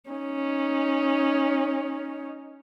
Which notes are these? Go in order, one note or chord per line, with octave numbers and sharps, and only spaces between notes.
C#4 D#4